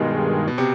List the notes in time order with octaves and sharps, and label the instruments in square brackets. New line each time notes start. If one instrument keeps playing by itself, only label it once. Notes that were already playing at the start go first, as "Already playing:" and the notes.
Already playing: [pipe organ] G2 D#3 G#3 [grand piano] B2
[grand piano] B2
C3